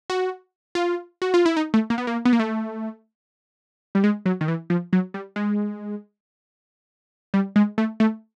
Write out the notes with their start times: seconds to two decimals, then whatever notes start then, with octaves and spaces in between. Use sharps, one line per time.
0.10 F#4
0.75 F4
1.22 F#4
1.34 F4
1.46 E4
1.57 D#4
1.74 A3
1.90 A#3
1.98 B3
2.07 A#3
2.25 B3
2.33 A#3
2.39 A3
3.95 G3
4.04 G#3
4.26 F#3
4.41 D#3
4.48 E3
4.70 F3
4.93 F#3
5.14 G3
5.36 G#3
7.34 G3
7.56 G#3
7.78 A3
8.00 A3